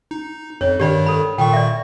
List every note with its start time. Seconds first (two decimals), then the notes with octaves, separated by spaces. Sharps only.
0.11 D#4
0.61 F2 C#5
0.80 G2 D#3 G4 D5 B5
1.06 A4 B5
1.38 A#2 D#3 G5 C#6
1.53 D5 E5